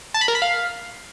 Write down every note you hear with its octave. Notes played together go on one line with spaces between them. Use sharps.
A5
B5
A#4
B5
F5